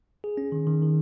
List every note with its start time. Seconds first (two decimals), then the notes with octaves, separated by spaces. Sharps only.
0.24 G#4
0.37 C#4
0.52 D#3
0.67 D#3
0.82 D#3